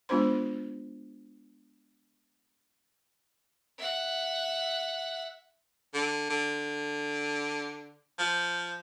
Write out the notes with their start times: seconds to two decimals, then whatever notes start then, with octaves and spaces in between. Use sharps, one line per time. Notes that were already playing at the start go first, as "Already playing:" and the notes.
0.09 G#3 B3 D4 F4 C5 C6
3.78 E5 F#5
5.94 D3
6.30 D3
8.19 F3